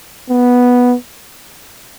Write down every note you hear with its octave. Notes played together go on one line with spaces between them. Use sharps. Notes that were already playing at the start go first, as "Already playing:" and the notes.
B3